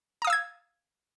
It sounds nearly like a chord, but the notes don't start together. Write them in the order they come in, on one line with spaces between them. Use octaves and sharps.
A#5 D#6 F5 E6 G#6